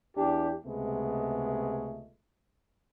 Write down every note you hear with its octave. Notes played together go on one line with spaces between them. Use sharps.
E2 D4 G4
C#2 C3 G#3 A3 B3